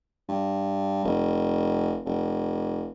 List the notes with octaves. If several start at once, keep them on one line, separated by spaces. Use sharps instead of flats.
G2
F1
F1